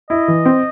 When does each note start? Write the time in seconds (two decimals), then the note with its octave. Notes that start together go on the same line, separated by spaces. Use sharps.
0.10 E4 D#5
0.28 E3
0.45 C4